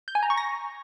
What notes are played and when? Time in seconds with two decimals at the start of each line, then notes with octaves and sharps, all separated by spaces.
0.08 G6
0.15 G#5
0.23 A#5
0.30 C#6
0.37 A#6